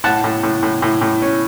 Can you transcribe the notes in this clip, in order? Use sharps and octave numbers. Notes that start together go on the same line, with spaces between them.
A2 F#5 A5
A2
A2
A2
A2
A2
C#4